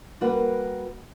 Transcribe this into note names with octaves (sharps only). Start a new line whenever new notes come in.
G3 A#3 F#4 A#4 B4